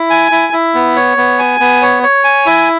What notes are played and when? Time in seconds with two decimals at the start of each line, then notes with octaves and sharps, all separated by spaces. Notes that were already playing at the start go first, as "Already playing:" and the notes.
Already playing: E4
0.10 G#5
0.31 E4
0.53 E4
0.75 B3
0.96 C#5
1.17 B3
1.39 G#5
1.60 B3
1.82 C#5
2.03 C#5
2.24 G#5
2.46 E4